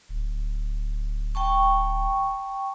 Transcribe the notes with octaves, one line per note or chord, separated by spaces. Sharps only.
D1
G5 A5 C#6